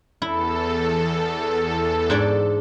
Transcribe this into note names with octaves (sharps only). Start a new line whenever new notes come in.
E2 E4 A4
G#2 D4 D5